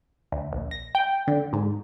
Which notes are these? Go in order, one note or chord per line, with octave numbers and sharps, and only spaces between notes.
D2
A#1
A#6
G5
D3
G#2